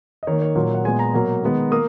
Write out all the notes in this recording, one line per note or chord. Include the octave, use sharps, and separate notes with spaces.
D#5
D#3 A#3 C#5
C#5
A#2 F#3 A#3
F#5
A#2 G#3 B3 G#5
A#5
B2 F#3 A#3
D#3 G#3 B3
A#3 D#6